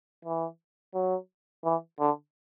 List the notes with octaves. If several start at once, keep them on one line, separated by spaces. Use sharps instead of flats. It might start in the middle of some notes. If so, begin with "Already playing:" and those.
E3
F#3
E3
D3